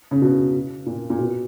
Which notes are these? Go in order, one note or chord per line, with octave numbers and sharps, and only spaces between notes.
C#3
B2
A#2
A#2
B2